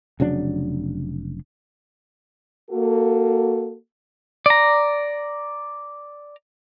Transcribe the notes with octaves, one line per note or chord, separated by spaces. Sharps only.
F1 C#3 F#3 D4
A#3 F#4 A4
D5 A#5